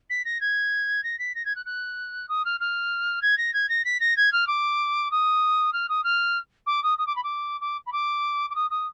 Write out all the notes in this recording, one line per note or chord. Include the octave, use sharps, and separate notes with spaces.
B6
A#6
G#6
A#6
B6
A#6
G#6
F#6
F#6
D#6
F6
F6
G#6
A#6
G#6
A#6
B6
A#6
G#6
F6
D6
D#6
F6
D#6
F6
D6
D#6
D#6
D6
B5
D6
D6
B5
D6
D6
D#6
D#6